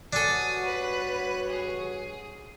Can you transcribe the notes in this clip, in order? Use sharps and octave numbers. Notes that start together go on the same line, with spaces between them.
G2 D4 F#4 A4 C#5 G#5 D#6
B4
G#4